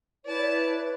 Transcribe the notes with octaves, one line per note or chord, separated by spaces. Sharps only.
E4 B4 C#5 D5 A5